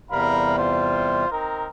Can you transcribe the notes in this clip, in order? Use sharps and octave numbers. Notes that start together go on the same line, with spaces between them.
E2 C3 G3 A#4 F5 B5
F4 C5
C4 D#4 A#4